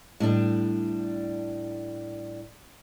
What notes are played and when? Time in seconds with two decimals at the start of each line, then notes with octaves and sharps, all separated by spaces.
0.20 A2 G3 D4